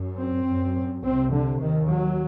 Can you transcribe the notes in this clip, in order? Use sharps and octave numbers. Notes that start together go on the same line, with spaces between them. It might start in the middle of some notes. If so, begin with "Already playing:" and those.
Already playing: F#2
C4
F#2
C2 C3 C4
D3
D#2 D#3
F#3